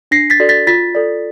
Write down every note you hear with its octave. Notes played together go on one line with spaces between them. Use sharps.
D4 A#6 C7
A6 B6
F#4 A4 D5
A6 B6
F4 A6 B6
A4 D5